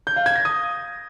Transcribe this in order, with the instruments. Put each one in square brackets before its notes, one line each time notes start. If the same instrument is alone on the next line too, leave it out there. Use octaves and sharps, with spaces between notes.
[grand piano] G6
F5
G#6
A#6
D#6